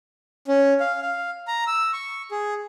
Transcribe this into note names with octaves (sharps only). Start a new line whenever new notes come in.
C#4
F5
F5
A#5
E6
C#6
G#4